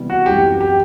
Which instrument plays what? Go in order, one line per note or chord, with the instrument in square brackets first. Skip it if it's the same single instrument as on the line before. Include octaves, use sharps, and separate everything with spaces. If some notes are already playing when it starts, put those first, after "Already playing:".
Already playing: [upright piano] C3 E3 G3 B3
[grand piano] F#4
[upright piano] F#2 E3 G3 C4 [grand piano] G4
[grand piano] G4